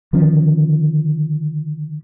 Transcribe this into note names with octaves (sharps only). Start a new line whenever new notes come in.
D3 D#3 F3 C#4